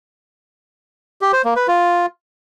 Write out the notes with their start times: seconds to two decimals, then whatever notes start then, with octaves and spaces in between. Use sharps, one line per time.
1.21 G4
1.33 C5
1.45 A#3
1.56 B4
1.68 F4